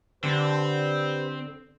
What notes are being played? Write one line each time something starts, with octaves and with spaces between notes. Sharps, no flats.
D3 C4 G4 B4 C5